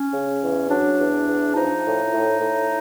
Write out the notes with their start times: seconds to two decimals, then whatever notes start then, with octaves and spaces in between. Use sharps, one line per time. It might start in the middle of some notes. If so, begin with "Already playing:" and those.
Already playing: C#4
0.13 C#3
0.42 E2
0.70 F#3 D4
0.99 E2
1.28 E2
1.56 F3 D#4
1.85 A2
2.13 A2
2.41 A2